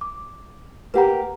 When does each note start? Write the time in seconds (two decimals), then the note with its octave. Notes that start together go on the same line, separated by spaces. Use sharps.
0.01 D6
0.94 A#3 G4 B4 F#5 A#5